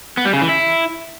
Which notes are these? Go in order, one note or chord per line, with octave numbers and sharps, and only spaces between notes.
B3
G3
C#3
E3
E4